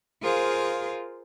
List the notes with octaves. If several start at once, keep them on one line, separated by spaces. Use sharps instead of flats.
F4 G#4 A#4 C5 F5